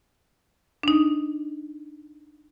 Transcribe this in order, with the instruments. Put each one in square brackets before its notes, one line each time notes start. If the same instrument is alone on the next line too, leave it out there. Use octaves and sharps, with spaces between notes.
[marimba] D4 D#4